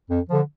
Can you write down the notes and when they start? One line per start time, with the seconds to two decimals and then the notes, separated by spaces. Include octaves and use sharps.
0.09 F2
0.29 D3 F3